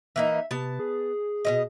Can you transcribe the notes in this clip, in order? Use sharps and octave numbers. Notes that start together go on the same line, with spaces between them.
E3 A#3 D#4 E5
C3 B3 A5
G#4
B2 F#3 D#5